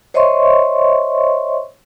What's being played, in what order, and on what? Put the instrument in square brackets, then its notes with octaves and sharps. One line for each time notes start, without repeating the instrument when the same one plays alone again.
[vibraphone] C5 C#5 D#5 E5 C6 C#6